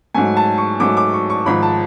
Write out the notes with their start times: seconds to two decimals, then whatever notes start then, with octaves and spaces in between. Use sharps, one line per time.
0.14 G#2 F#3 A3 G#5
0.37 A5
0.58 C#6
0.80 G#2 F#3 A3 D6
0.97 D6
1.13 C#6
1.30 C#6
1.46 G#1 G#2 F3 B5
1.63 A5